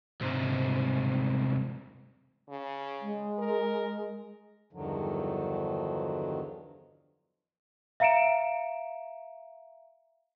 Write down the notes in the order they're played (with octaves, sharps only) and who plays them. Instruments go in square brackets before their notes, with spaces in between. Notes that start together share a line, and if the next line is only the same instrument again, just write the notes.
[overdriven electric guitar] C2 G#2
[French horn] C#3
[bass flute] G#3
[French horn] A#4
[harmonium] E2 G2 D3 D#3 F3 F#3
[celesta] E5 F5 A#5 C#7 D7 E7